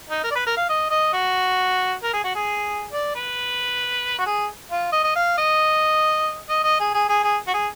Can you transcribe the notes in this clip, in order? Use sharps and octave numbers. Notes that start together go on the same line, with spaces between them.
D#4
A#4
D5
B4
A#4
F5
D#5
D#5
F#4
A#4
G#4
F#4
G#4
D5
B4
F#4
G#4
F4
D#5
D#5
F5
D#5
D#5
D#5
G#4
G#4
G#4
G#4
F#4
G#4